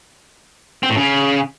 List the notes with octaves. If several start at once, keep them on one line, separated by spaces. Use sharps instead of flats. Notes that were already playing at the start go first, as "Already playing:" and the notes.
C4
A2
C#3